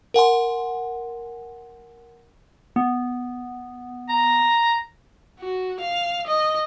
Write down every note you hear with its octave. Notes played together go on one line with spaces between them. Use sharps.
A#4 F#5 G#5 C6
B3
A#5
F#4
F5
D#5